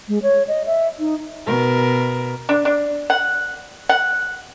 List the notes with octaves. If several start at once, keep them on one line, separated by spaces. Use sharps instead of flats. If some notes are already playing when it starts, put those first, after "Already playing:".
G#3
C#5
D#5
E5
D#4
B2 A#4
D4
D4
F#5
F#5